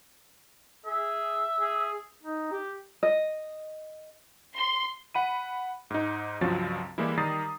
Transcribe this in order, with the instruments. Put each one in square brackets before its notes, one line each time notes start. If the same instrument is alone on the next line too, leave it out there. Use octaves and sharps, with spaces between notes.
[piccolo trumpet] G#4 [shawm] E5
[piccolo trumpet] G#4
[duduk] D#4
G4
[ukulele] D#5
[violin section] C6
[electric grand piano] F#5 B5 D#7
G#2 D#4
C#2 G2 F3 F#3 C4 A6
E3 G3 G#3 A#3 E4
D#3 G3 A#5 D#6 A6 C7